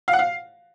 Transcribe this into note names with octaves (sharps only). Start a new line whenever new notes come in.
F5
F#5
F5